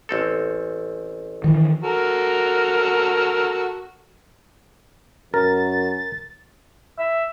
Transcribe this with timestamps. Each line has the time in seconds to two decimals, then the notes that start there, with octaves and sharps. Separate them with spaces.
0.09 A1 C4 A4
1.44 D#3 E3
1.83 F#4 A4 A#4
5.34 F#2 A#4 A6
6.99 E5